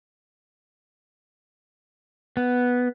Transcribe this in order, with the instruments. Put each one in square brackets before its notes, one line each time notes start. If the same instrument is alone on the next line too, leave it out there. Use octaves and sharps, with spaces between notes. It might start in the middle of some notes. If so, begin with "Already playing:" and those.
[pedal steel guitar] B3